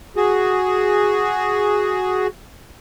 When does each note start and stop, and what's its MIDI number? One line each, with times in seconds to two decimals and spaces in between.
0.16 2.27 66
0.16 2.27 68